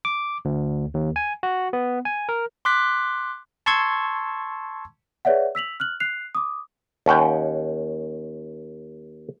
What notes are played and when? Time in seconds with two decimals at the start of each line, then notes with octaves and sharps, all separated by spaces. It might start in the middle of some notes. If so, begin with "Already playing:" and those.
0.05 D6
0.45 D2
0.94 D#2
1.16 G#5
1.43 F#4
1.73 B3
2.05 G#5
2.29 A#4
2.65 C6 D6 F#6 B6
3.66 A5 C6 C#6 E6 G#6
5.25 G#4 B4 C#5 D5 E5 F#5
5.55 E6 B6 F7 F#7
5.80 F6 F#6 F#7
6.00 F#6 C7 F7
6.35 D6 D#6
7.06 D#2 C#4 F#5 G5